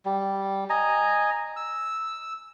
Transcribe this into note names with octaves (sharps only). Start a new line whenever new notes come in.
G3
D#5 G#5 A#5
E6